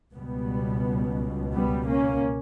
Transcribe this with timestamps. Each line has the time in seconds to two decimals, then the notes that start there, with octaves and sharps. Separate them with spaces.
0.14 C#2 B2 G3 B3
1.53 G3 B3
1.87 A#3 C#4